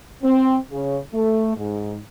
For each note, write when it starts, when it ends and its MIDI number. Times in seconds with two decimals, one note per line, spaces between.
0.24 0.55 60
0.71 0.98 49
1.14 1.56 57
1.57 1.96 44